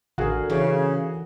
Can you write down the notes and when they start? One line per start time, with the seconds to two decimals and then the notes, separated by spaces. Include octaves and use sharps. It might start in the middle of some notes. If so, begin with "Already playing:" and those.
0.18 A1 D3 F#4 G#4 A#4
0.50 C#3 E3